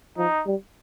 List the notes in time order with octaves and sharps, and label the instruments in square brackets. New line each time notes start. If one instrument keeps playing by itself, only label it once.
[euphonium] F3 [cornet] D#4
[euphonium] G3